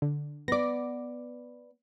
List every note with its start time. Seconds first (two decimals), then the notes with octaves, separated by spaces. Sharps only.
0.02 D3
0.48 B3 D5 D6 A#6